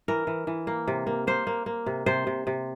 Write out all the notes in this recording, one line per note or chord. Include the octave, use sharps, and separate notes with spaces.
E3 A#4
E3
E3
A#3
C3
A#3
A#3 C5
A#3
A#3
C3
C3 C5
C3
C3